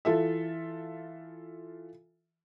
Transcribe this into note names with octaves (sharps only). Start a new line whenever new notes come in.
E3 F4 A4 E5